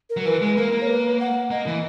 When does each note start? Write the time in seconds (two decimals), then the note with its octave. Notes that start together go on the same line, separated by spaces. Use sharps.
0.10 A#4
0.17 F#3
0.25 E3 B4
0.41 G#3
0.57 A#3 A#4
0.72 A#3
0.82 C#5
0.88 B4
1.20 F#5
1.51 A#3 D#5
1.66 E3